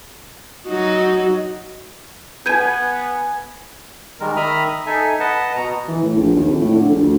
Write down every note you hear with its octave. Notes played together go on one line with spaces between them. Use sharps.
F#3 D#4 F#4
B3 B4 G#5 G6 G#6 D#7
D#3 G3 G#3 A#4
D#3 E5 A#5 B5 D#6 F6
D#6
D#4 A4 E5 G#5
B4 D#5 F#5 A5
B2 A#5
E3
A2
A#1
D#2
F2
A2
D3
A#1
D2